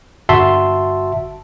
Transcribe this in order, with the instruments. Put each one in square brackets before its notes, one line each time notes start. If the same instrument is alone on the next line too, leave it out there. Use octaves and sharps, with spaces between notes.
[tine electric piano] G1 F#4 E5 A5 C6